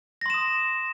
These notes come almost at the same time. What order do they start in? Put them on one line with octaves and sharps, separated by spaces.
A#6 C6 E7 D#6